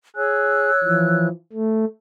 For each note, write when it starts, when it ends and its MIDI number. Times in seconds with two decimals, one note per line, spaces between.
0.16 0.71 68
0.16 1.26 73
0.16 1.26 88
0.16 1.26 90
0.84 1.29 52
0.84 1.29 53
1.53 1.85 57